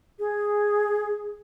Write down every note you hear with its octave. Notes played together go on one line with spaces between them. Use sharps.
G#4